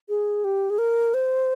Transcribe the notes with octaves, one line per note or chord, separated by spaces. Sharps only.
G#4
G4
G#4
A#4
C5